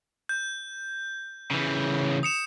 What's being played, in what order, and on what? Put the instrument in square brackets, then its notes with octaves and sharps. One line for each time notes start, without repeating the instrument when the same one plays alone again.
[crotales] G6
[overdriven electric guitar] C#3 E3
[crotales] D#6 C#7 E7